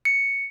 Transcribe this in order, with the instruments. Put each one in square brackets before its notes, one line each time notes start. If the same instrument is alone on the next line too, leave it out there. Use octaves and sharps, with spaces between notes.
[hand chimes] C#7